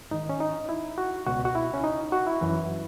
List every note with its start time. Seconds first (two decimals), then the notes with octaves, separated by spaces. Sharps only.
0.11 G#2 D#3 D#4
0.29 C#4
0.40 D#4
0.69 E4
0.98 F#4
1.26 C#2 B2 F#4
1.45 F#4
1.55 E4
1.74 C#4
1.84 D#4
2.12 F#4
2.27 E4
2.41 F#2 E3